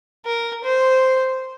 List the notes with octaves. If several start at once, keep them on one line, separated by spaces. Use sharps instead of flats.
A#4
C5